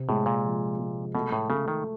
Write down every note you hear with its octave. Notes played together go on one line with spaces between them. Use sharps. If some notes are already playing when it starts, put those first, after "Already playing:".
Already playing: C3
A2 G#3
A#2
F3
G#3
B2 A3
A2
C#3 A3
D#3